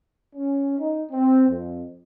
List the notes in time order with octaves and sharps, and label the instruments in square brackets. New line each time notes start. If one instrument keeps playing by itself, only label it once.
[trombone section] C#4
D#4
C4
F2